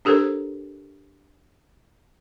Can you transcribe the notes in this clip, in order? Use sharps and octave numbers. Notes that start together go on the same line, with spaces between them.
D4 G4 A4 A#4 C5